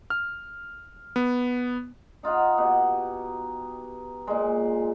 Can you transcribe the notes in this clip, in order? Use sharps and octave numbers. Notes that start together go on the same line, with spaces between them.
F6
B3
D#4 F4 D#5 F#5
B2 G4 F#5
A#2 G#3